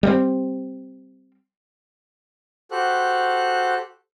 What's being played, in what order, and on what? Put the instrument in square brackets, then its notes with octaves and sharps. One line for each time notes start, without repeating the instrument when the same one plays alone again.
[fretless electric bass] G3 A3 C4
[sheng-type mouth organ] F#4 G4 A4 C5 F#6